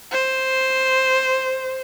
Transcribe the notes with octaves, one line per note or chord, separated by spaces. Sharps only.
C5